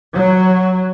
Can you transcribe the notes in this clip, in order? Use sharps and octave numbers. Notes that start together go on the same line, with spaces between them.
F#3